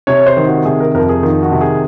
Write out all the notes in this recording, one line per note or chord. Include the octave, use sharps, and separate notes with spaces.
C3 C#5
C5
D#3
F#4
C3 G#4
A#4
F2 A#4
G#4
D#3 F4
F#4
C3
G#4